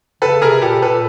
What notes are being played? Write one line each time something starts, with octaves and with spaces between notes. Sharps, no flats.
C#3 A4 B4
C3 G#4 A#4
A#2 G4 A4
A#2 A4 B4